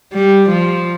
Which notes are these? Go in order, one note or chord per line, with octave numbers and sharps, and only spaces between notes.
G3
F3